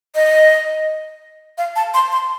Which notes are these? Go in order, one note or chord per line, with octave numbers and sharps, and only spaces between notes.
D#5
F5
A5
C6
C6